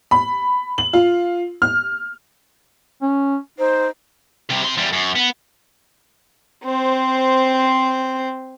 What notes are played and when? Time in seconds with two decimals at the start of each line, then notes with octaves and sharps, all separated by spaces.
0.11 B5
0.78 F#7
0.93 F4
1.62 F6
3.02 C#4
3.59 D#4 C5
4.50 C3 G3
4.64 C3 C6
4.77 E2 G3
4.93 F#2
5.16 B3
6.64 C4 C5